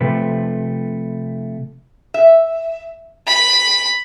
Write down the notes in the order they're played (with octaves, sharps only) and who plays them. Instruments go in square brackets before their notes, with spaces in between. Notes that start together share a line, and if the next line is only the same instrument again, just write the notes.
[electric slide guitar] C3 F3 A3 B4
[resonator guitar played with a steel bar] E5
[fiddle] B5